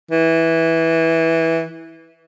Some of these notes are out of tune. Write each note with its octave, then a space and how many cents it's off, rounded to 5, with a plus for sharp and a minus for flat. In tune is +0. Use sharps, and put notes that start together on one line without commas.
E3 -10